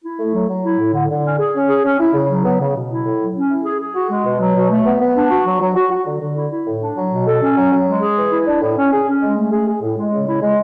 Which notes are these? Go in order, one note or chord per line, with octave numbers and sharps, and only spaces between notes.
E4
A3
F#3
F#3
E4
A2
D3
D3
C#4
G#4
C#4
G#4
C#4
E4
C#3
F#3
B3
C#3
B2
E4
A2
F#3
C#4
E4
G#4
G#4
F#4
G#3
B2
F#3
B2
A3
B3
B3
D4
F#4
F#3
F#3
F#4
F#4
D3
D3
E4
E4
A2
D4
F#3
B2
A4
C#4
F#3
F#3
G#3
G#4
E3
E4
D4
A2
C#4
G#4
C#4
G#3
A3
G#4
G#4
A2
G#3
C#3
E4
G#3